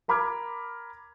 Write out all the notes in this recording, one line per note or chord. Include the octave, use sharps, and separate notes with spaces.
A#4 A#5 B5 D6 F6 G#6